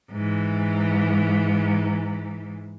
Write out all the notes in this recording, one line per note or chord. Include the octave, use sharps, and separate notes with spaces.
G#2 E3